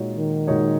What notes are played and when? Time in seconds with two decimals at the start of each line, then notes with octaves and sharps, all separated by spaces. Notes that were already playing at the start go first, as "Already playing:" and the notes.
Already playing: A#2 G#3 D#4 F#4 C#5
0.16 D#3
0.47 A#2 G#3 D#4 F#4 C#5